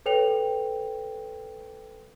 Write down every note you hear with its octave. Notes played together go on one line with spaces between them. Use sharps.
A4 B4 C#5 G5 F7